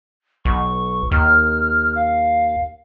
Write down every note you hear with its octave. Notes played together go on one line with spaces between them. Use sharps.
B1 C#6
D#2 F6
F5